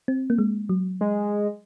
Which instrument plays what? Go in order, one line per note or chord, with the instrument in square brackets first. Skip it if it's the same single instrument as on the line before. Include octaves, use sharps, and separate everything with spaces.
[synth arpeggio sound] C4
A#3
G#3
F#3
[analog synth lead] G#3